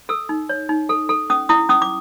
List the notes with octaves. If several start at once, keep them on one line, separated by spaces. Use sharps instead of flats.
A4 E6
D#4
C#5
D#4
A4
A4
C#4 D#6
E4 D#6
C#4 D#6
D6